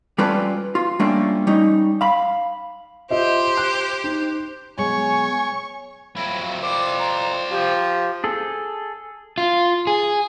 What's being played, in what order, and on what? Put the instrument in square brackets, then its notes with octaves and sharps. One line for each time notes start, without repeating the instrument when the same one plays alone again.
[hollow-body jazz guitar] G3 C#4 F4 A4 B4 D5
F4
G3 A3 A#3 C#4 D4 F4
G3 C#4 D#4
F5 B5
[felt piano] F4 D#5 E5 [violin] G4 C5
[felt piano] F#6
D#4
[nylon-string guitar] B2 F#3 G#3 [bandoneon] C#5 [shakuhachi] G#5 [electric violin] C#6
[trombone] F2 [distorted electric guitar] F#3 E4 [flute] B5
[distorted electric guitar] C5 D5 [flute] D6
[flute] A#5
[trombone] F3 [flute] G4
[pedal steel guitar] G#4 A4
[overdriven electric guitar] F4
G#4